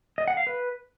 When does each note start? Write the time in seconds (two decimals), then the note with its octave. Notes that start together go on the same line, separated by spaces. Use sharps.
0.18 D#5
0.28 F#5
0.37 F5
0.47 B4